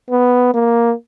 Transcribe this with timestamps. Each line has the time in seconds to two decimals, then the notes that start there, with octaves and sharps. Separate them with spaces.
0.10 B3
0.54 A#3